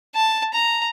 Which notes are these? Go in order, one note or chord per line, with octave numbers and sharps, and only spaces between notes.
A5
A#5